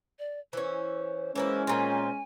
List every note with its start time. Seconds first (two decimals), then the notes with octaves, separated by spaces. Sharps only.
0.19 D5
0.53 E3 C#4 C5
1.36 E3 G#3 A#3 C#4 E4 C5
1.67 A#2 C4 G#5